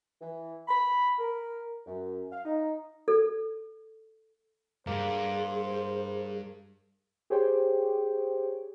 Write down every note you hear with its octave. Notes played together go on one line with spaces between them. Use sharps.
E3
B5
A#4
F#2
F5
D#4
A4
G2 A#3 G#4 C5
G4 G#4 C5 C#5 G5